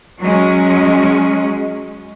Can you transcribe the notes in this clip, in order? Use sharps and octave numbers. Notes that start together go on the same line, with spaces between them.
F#3 G#3 C#4